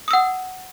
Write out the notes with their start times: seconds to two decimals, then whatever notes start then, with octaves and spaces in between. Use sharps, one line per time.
0.08 D#6
0.11 E6
0.13 F#5